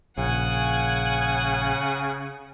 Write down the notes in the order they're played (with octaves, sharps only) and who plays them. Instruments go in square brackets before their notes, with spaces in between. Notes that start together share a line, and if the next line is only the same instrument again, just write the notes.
[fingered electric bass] A#1 [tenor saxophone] C#3 [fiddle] F#5 G#5